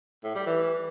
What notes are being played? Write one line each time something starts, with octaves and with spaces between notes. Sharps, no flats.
A2
G3
E3